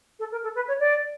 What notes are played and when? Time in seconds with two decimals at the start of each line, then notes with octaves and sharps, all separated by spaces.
0.19 A4
0.31 A#4
0.43 A4
0.55 B4
0.68 C#5
0.79 D5